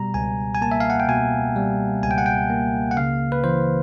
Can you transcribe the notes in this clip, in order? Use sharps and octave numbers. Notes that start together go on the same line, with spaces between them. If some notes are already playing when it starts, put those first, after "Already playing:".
Already playing: B2 G3 A#5
C#2 G#5
G#5
A#3 A5
E5
F5
F#5
G5
B2 G#5
G3
C#2 G#5
G5
F#5
G5
A#3
F#5
C#3 F5
B4
E3 C5